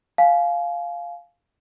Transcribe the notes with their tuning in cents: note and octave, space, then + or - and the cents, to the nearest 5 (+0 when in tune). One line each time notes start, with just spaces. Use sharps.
F5 +0 G#5 +35